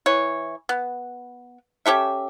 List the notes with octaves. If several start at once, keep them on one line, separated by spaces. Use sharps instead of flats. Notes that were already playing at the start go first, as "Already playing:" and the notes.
E3 C#5
B3
C#4 G4 A4 E5